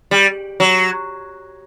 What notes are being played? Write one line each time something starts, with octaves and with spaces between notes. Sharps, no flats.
G3
F#3